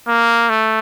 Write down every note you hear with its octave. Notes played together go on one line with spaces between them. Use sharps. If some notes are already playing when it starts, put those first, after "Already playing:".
A#3
A3